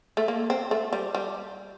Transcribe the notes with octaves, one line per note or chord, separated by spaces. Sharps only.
A3
A#3
C4
A3
G3
G3